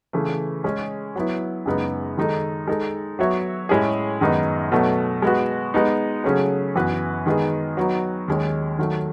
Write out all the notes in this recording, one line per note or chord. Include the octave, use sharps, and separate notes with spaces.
C#3 E3 A3
G#3 C#4 G#4
F#3 B3 E4
F#2 C#3 G#3 B3 D#4
D#3 G#3 D#4 A4
G#3 D#4 A4
F#3 B3 F#4 C#5 E5
A2 G#3 C#4 E4 G#4
F#2 D#3 G#3 B3 D#4
B2 F#3 A3
G#3 B3 F#4
G#3 B3 D#4
C#3 F#3 A3 C#4 G#4
F#2 E3 B3 F#4 B4
D#3 G#3 B3 D#4 G#4
F#3 B3 D#4 F#4
D#2 D#3 G#3 C#4
D#3 F#3 A3